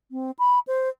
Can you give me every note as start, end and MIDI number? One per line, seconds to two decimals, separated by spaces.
0.11 0.31 60
0.39 0.59 83
0.67 0.89 72